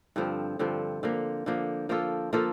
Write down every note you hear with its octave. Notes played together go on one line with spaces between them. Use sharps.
G2 D3 F3 C4
G2 D3 F3 C4
D3 F3 A#3
D3 F3 A#3
F3 A#3 F4 A4
F3 A#3 F4 A4